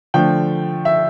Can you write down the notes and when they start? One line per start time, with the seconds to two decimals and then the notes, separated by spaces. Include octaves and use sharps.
0.14 D3 F3 A3 G5
0.85 E5